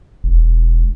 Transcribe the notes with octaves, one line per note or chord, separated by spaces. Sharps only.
E1